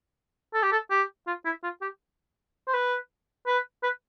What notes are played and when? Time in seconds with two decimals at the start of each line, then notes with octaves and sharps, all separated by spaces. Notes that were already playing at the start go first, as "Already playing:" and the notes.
0.54 A4
0.63 G4
0.72 A4
0.91 G4
1.27 F4
1.45 E4
1.63 F4
1.81 G4
2.67 C5
2.74 B4
3.47 B4
3.83 B4